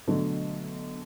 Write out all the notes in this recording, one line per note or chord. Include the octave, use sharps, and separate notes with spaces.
B2 D3 F#3 A3